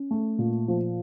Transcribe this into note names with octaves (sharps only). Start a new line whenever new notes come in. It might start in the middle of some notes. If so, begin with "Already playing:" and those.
Already playing: C#4
A3
A#2
F3